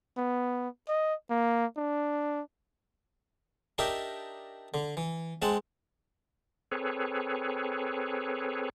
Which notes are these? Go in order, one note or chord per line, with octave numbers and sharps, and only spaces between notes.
B3
D#5
A#3
D4
D4 D#4 G4 A#4 E5
D3
E3
G#3 C4 F#5 A5
C4 G#4 A4 B4 C#5